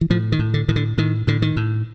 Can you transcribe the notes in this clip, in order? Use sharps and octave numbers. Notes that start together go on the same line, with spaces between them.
E3
A2 F3
D#3
A2
D3
A2 D#3
D3
A2 D#3
A2 D3
D#3
A2